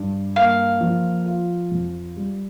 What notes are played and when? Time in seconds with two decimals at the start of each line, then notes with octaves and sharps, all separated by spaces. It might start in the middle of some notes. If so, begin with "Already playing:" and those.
Already playing: G2
0.36 A#3 F5
0.81 F3
1.26 F4
1.71 F2
2.17 G3